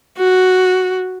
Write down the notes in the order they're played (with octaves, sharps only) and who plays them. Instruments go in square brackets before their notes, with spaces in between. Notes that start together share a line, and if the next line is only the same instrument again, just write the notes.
[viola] F#4